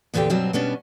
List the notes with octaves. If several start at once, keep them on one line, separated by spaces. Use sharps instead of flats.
E2 A#2 D3 F4 G4 G5
G2 B2 F#3 G3 C4
B2 G3 B3 C#4 D4